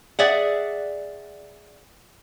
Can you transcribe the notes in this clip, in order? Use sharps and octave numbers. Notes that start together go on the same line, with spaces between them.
G#4 D5 E5 F#5